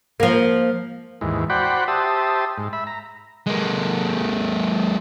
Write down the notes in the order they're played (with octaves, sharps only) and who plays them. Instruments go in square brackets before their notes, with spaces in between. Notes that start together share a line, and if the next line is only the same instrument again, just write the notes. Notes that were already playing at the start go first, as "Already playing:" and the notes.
[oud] F3 A#3
[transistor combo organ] D#2 G#2 E3
F#4 C5 D5 F#5 G5 B5
G4 C5 E5 A5 D#6
G#2
E5 B5
A#5
[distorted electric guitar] G#3 A#3